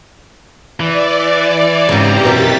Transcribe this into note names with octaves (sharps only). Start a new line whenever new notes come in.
E3 D5
G#2 C#3 E3 C4 G4 A#5
F#2 B2 D#3 A6 B6